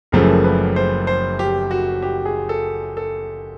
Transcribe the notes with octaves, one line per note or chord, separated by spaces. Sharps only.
F#1 F#2 C#3 F3 A3 A#4
B4
C5
C5
G4
F#4
G4
G#4
A4
A4